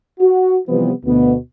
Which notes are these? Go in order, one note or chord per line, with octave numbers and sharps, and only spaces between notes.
F#4
C3 E3 F3 G3 B3
D2 B2 B3